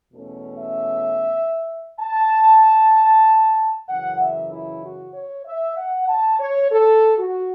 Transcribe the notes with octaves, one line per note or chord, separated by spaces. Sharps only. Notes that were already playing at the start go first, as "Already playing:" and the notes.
E2 B2 A3 C#4
E5
A5
F#2 C#3 E3 F#5
E5
E4
F#4
C#5
E5
F#5
A5
C#5
A4
F#4